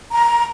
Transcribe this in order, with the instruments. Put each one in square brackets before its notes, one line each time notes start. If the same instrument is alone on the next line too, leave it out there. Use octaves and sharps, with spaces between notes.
[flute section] A#5